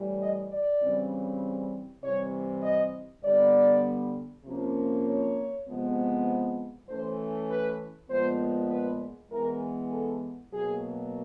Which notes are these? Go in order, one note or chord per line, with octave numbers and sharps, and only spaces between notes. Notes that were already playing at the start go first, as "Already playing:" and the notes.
Already playing: A2 E3 G3
D#5
D5
C#3 E3 G3 C4
C3 E3 G3 C#5
D#5
D3 G3 B3 D5
C3 F3 A#3 C#4
C#5
C3 F3 G#3 B3
E3 A3 C#4 C5
B4
A#2 F3 G#3 B3 C5
B4
E3 G#3 B3 A#4
A4
B2 F#3 A#3 G#4